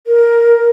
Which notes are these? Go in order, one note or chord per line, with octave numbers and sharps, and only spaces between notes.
A#4